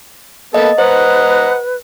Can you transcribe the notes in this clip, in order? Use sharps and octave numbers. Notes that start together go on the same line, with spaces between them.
A#3 B3 A4 D#5
B4 C5 D#5 F#5 A#5